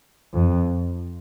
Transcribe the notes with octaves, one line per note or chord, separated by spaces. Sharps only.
F2